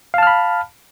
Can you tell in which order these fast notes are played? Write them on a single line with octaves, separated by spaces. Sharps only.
F5 A5 F6 B5